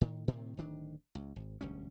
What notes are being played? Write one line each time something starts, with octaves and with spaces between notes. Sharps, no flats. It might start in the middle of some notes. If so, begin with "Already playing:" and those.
A2 D#3
A2 C3 D#3 C4
D1 D#3 D4
C#2
G#1
E1 D2 G3 C#4